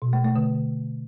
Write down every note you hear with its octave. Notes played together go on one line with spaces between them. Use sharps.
B2
A3
A3
D3